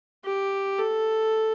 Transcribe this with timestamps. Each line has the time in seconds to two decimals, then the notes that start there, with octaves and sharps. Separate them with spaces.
0.25 G4
0.79 A4